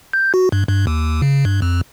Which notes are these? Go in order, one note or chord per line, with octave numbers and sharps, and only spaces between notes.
G6
F#4
G2
G2
D#2
C#3
G2
F2